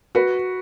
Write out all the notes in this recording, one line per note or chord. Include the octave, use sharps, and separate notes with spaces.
F#4 B4